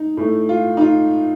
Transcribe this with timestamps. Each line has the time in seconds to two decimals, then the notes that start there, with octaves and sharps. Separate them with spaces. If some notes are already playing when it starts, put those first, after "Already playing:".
Already playing: D#4
0.17 A2 A3
0.49 F4
0.77 D#4
0.81 F4